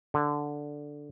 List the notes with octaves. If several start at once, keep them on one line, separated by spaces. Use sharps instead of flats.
D3